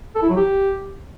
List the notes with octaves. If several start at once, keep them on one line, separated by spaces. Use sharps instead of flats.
A4
E4
F#3
G4